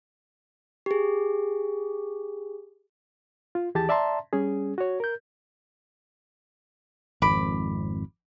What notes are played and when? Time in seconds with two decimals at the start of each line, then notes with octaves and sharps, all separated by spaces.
0.86 G4 G#4
3.55 F4
3.75 D#2 E3 G4 G#4 A5 A6
3.89 D5 E5 A5 A#5 C6
4.33 G3 C#4 G#4
4.78 F#4 C#5
5.00 A#4 G6
7.22 G#1 F2 B5 D6